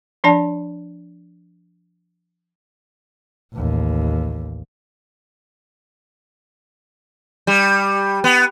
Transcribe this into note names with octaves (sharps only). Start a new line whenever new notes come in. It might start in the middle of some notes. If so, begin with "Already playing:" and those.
F3 D4 D5 A5
A1 D#2
G3
B3